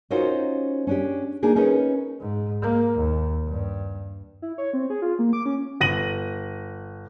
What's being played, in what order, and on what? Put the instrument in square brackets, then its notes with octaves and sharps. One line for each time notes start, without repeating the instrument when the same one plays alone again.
[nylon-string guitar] C#4 D#4 F4 F#4 A#4 C5
C#4 D4 G4
A#3 D4 D#4 G#4 A#4
C#4 D#4 A#4 B4
[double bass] G#2
A#3
D#2
G2
[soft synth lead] E4
C#5
C4
G#4
F4
A#3
D6
C#4
[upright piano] G1 A#6 D#7 F#7